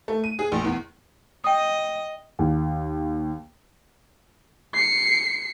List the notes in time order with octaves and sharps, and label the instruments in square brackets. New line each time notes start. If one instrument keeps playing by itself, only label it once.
[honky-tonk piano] A3
D#7
G#4
A#1
E2
[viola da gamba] D#5 [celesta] G5 D#6
[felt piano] D#2
[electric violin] C7 C#7